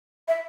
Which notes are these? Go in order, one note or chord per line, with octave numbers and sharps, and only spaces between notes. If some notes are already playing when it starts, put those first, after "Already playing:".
E5